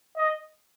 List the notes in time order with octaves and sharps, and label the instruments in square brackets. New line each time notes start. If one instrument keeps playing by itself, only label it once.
[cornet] D#5